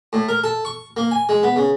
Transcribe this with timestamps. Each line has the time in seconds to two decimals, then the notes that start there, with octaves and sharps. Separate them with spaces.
0.13 A2
0.29 A#4
0.44 A4
0.65 C#6
0.97 A#3
1.11 G#5
1.29 G#3
1.43 B3
1.56 C#3